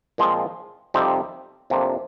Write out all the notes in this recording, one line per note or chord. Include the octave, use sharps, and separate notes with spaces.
A#2 F3 G#3 C4 F4
F2 C3 G3 C4 D#4
F2 C3 F3 A#3 D4